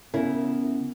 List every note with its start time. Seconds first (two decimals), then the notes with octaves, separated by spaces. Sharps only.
0.14 C#3 B3 E4 A#4